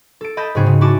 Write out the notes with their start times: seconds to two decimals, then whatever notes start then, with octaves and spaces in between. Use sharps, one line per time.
0.21 A4 D7
0.37 D#5 A5 B5 G6 A#6
0.55 G#2 C#3 C4 F#4 G#4
0.66 C#3
0.81 E4 F#4 G#5 A5 D6